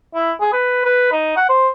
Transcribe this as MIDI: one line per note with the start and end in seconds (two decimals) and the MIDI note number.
0.15 0.32 64
0.41 0.49 68
0.53 0.85 71
0.85 1.07 71
1.12 1.32 63
1.37 1.46 78
1.49 1.69 72